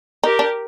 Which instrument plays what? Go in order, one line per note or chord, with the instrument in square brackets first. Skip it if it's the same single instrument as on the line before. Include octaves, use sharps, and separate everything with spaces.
[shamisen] D#4 [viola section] G4 A#4
[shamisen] D4